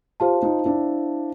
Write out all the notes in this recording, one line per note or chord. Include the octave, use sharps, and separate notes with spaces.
F4 G4 C5 F5 A5
D#4 F4
D4 E4